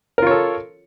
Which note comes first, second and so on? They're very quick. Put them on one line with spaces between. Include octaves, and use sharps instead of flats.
A#4 F4 C#5 A4